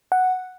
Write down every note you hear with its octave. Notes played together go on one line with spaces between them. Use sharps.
F#5